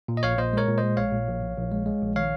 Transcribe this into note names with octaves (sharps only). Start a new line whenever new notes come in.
A#2
D#5
A#1 C#5 F5
A#2 C5 D#5
G#3 A#4 C#5
A#2
C5 D#5
G#3
A#1 C#5 F5
A#2
A#1
A#1
A#1
G#3
G#3
A#1
D#3 C#5 F5